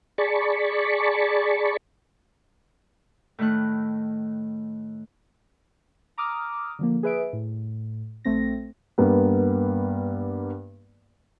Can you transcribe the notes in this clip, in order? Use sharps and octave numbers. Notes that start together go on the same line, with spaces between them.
G#4 D5 A5 B5 C#6
A2 D#3 A3 F#6
A#5 D6 D#6 F6
D3 F3 A#3
G#4 B4 E5 D7
A2
A#1 A3 C4 A#6
G2 A#3 B3